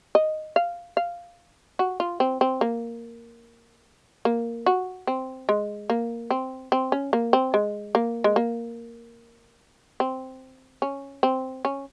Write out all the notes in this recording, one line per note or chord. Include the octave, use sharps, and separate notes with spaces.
D#5
F5
F5
F#4
F4
C4
C4
A#3
A#3
F#4
C4
G#3
A#3
C4
C4
C#4
A#3
C4
G#3
A#3
G#3
A#3
C4
C#4
C4
C#4